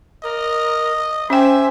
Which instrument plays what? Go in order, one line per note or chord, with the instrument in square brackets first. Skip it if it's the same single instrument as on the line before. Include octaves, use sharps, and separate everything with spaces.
[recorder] A#4 [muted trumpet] D#5
[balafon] C#4 G5 [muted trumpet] G4 [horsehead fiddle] C5 G#5 [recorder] E5